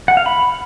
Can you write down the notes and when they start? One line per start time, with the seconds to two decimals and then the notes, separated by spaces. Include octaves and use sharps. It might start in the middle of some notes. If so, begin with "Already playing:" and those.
0.08 F#5
0.17 F5
0.26 B5